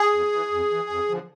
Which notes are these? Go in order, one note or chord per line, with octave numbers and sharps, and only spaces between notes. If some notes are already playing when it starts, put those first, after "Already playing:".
Already playing: G#4
F2
E3
F2
E3
F2
D3 F3